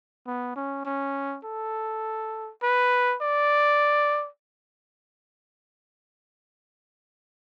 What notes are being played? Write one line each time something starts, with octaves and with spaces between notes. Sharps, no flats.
B3
C#4
C#4
A4
B4
D5